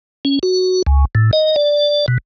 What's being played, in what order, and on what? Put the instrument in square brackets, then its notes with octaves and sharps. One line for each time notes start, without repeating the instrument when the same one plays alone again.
[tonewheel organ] C#4
F#4
C#2
A2
D#5
D5
B2